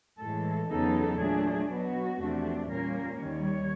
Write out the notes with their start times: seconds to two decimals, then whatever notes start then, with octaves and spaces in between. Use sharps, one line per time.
0.20 A2 E3 G#3 A4
0.70 E2 C#3 F#3 B3 D#4 A4
1.19 A#2 F#3 A3 D4 G#4
1.69 B2 F#3 B3 F#4
2.19 E2 C3 F3 A3 D4
2.68 A#2 G3 A#3 C#4 A#4
3.19 D#2 D#3 G3 C#5